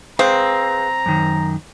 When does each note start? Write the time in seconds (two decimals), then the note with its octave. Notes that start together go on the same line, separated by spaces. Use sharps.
0.19 C4 G#4 B4 F5 A#5
1.06 F#2 D#3